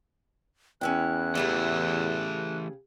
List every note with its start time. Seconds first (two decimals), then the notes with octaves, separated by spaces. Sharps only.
0.81 E2 C#4 E4 G5 F#6
1.35 C#3 E3 A3 G4 G#4